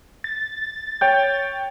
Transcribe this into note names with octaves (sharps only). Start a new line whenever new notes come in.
A6
C#5 G5 G6